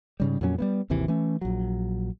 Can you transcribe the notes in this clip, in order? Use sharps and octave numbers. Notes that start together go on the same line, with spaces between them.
G#2 C#3 G3
F2 A#2 F#3 C#4
G3 A#3 B3
G#1 D#2 C3 E3
E3 A3 C#4
A#1 F#3